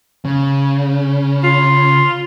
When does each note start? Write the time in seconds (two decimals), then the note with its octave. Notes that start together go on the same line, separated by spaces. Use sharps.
0.25 C#3
1.43 F4